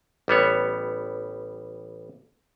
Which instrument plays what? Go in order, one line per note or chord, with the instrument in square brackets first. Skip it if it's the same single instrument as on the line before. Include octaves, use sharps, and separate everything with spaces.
[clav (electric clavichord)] A1 G3 B3 C#5